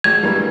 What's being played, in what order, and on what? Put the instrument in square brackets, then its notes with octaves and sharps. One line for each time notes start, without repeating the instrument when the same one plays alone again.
[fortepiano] G#1 [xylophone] G#6
[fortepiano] G2 E3 G3 A#3